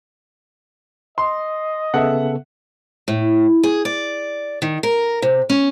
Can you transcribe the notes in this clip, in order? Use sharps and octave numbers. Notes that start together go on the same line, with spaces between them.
D#5 C6
C#3 B3 A4 E5 F#5
A2
G#4
D5
D#3
A#4
C3
C#4